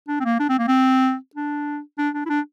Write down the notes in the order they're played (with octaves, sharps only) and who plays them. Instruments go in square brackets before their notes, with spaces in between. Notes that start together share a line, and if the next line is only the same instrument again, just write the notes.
[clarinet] D4
C4
A#3
D4
C4
A#3
C4
D4
D4
D4
E4
D4